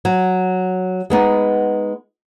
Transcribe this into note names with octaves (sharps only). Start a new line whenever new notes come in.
F#3
G#3 B3 D#4